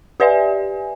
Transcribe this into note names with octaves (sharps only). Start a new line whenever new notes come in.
G4 B4 D5 E5 G#5